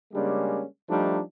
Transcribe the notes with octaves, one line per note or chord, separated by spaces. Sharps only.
C#3 G3 G#3 A#3 C#4 D4
F3 G3 A3 D4 D#4